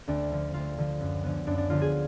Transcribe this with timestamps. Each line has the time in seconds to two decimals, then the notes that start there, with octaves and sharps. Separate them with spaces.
0.08 D2 D4
0.31 D3 F3
0.54 D2 F4
0.78 D3 F3
1.01 F#2
1.24 D3 F3 B3
1.47 F#2 D4
1.58 D4
1.70 D3 F3 B3 F4
1.81 G#4